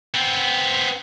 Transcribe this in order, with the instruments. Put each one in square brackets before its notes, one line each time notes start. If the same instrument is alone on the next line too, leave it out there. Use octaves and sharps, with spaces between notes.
[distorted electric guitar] B3 C4